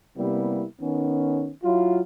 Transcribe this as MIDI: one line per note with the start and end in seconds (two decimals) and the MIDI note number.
0.17 0.65 48
0.17 0.65 55
0.17 0.65 58
0.17 0.65 59
0.17 0.65 64
0.82 1.51 51
0.82 1.51 59
0.82 1.51 61
1.64 2.01 54
1.64 2.01 64
1.64 2.01 65